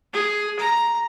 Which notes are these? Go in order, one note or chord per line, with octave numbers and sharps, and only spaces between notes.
G#4
A#5